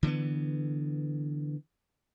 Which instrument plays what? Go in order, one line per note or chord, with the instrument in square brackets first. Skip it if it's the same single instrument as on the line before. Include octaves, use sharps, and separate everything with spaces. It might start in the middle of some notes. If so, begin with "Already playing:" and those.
[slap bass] D3 E3 G#3 B3